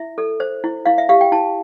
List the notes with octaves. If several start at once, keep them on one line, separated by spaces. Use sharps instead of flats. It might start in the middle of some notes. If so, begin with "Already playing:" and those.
Already playing: E4 E5
A4
C5
E4
E4 F5
E5
G4 F5
G5
E4 A5